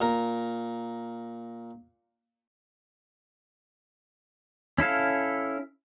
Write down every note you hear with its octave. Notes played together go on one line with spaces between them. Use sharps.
A#2 A#4
C#4 E4 A4 F5